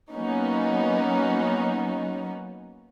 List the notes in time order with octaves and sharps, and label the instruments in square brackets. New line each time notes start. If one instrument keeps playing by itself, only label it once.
[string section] F#3 A#3 B3 C#4 D#4 F#4